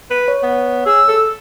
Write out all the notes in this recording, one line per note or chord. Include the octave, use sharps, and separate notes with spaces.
B4
C#5
B3
G#4 E6
A4